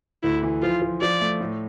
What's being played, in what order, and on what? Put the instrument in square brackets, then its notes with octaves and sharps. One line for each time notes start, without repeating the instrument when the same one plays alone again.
[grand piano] D2 [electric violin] E4
[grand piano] E3
[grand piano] F3 [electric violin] F4
[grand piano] F3
[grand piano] F3 [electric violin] D5
[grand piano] A3
A2